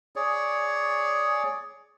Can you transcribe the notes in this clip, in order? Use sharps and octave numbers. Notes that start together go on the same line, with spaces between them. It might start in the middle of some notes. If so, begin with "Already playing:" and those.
G#4 C#5 D5